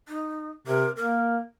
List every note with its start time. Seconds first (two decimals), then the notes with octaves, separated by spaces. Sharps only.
0.08 D#4
0.67 C3 A#4
0.97 A#3 A#4